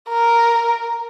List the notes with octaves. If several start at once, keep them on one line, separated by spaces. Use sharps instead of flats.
A#4